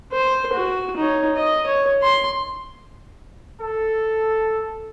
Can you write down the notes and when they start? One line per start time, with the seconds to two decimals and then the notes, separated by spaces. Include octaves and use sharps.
0.12 C5
0.54 F#4
0.96 D#4 C#5
1.35 D#5
1.67 C#5
2.02 C6
3.59 A4